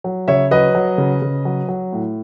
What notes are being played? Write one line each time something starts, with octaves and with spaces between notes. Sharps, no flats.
F#3
C#3 C#5 E5
F#3 B4 D#5
F#3
C#3
C#3
F#3
F#3
A2